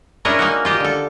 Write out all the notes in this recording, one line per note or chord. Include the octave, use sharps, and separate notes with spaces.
C#4 D4 E4 G#4 A#4 D#5
A#3 D#4 F#4
F4 G4 D#5
D3 A4